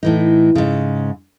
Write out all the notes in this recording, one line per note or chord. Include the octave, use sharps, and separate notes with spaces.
A2 E3 D#4
G#2 C#3